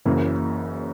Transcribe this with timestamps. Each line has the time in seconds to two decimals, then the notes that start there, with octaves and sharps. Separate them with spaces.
0.05 F#1 F#2 C#3 E3 A#3